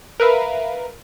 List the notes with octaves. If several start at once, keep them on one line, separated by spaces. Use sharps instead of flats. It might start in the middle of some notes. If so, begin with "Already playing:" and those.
A#4 B4 E5 F5